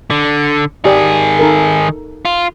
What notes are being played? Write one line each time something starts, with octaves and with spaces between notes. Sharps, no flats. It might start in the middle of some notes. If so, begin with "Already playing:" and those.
D3
D#3 G4 G#4 D5
D#4 A4 A#4
F4